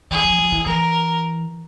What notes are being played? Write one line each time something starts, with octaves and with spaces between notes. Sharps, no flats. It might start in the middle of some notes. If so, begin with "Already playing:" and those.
E3 G#4
F3
F3
E3
E3 A#4